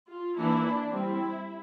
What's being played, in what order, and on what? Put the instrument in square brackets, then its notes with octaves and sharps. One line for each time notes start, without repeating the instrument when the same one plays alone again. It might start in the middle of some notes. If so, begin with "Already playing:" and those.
[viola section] F4
E3 A#3 D4 E4
D4
G3 C4 E4